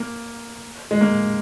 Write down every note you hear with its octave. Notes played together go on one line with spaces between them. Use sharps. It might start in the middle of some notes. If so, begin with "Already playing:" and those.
Already playing: A#3
G#3
A#3